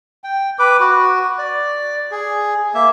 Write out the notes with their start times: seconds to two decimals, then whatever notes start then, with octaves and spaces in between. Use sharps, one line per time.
0.24 G5
0.59 B4 D6
0.80 F#4
1.39 D5
2.11 G#4
2.74 A#3 E5